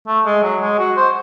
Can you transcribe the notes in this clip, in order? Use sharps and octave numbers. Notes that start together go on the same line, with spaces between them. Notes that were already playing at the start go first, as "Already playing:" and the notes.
A3
G#3
F#3
G#3
F#4
C5